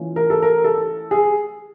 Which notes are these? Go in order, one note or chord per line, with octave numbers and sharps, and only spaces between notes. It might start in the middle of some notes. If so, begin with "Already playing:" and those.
Already playing: E3 A3 C#4 F4
A#4
A4
A#4
A4
G#4